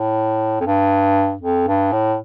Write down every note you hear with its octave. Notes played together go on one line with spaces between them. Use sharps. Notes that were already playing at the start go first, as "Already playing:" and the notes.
Already playing: A2
F2
G2
F2
G2
A2